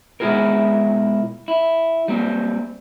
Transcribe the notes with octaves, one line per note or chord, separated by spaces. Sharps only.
B2 G#3 E4 F4 G#4 A#4
E4
G3 A#3 C4